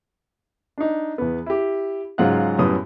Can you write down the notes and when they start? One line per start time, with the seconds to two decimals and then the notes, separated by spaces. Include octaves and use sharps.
0.78 D4 D#4
1.18 E2 B3
1.46 E4 G4
2.18 G#2 C#3 F#3 F4 F#5 F#6
2.59 F#2 A2 G3 B3 D#6